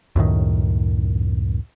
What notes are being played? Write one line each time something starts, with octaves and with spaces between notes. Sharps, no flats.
C#2 F#2 A2 D#3